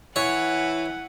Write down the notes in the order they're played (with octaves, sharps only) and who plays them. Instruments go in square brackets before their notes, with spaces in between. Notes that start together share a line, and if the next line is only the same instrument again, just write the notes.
[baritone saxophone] E3 [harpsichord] C#5 [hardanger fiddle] F#5